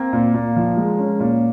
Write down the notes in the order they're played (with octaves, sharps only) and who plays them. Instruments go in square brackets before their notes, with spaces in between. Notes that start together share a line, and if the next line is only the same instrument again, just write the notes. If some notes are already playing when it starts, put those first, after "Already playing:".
Already playing: [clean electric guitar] A#3 [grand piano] C4
[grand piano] A#2
A#2
F3
G#3
C#4
A#2